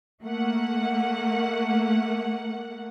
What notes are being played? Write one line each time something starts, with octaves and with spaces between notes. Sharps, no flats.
A3 A#3 F#5